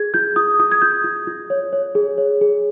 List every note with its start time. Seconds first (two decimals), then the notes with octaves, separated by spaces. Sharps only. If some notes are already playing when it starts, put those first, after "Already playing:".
Already playing: G#4 G#6
0.14 F4 G6
0.36 F4 D#6
0.60 F4 D#6
0.72 G#6
0.82 F4 G6
1.04 F4
1.27 F4
1.50 C#5
1.73 C#5
1.95 G#4
2.18 C#5
2.41 G#4